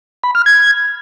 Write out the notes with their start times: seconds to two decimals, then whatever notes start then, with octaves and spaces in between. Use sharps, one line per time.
0.23 B5
0.35 F6
0.46 G#6